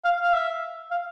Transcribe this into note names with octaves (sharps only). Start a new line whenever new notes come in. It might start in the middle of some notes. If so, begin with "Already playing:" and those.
F5
F5
E5
F5